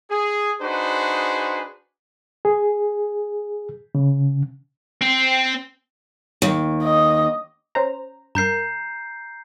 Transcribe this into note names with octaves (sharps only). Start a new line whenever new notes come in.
G#4
D4 D#4 F#4 G#4 B4 C5
G#4
C#3
C4
D#2
D#5
C#4 C5 A#5
G2 A#4 A#5 G6 C7